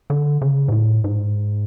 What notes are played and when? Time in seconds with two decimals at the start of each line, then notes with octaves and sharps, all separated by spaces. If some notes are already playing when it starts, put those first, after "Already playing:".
0.10 D3
0.41 C#3
0.68 G#2
0.72 A2
1.04 G#2